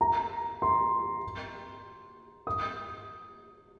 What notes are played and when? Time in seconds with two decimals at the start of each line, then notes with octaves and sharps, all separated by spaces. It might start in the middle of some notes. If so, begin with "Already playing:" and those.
0.01 A#5
0.62 C6
2.47 D#6